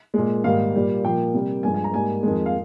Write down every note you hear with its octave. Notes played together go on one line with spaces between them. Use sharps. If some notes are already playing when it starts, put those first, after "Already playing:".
A#2 G#3
G#2 D#3 G3 A#3 F5
A#2 G3 A#3
A#2 F3 A#3 G5
C3 G3 A#3
G2 F3 G#3 G#5
G#5
A#5
G#2 G3 A#3 G#5
F2 D#3 G#3
F5